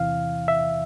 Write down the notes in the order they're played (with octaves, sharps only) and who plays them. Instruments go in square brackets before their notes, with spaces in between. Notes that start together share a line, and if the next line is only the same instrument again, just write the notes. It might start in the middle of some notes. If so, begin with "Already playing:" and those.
Already playing: [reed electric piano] E2 C3 E3 F5
E5